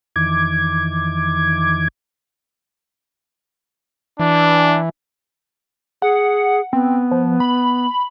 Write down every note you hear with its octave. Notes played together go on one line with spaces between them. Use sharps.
F2 D#3 E3 D6 G#6
E3 D4
G#4 F#5
B3 C4
F3
B5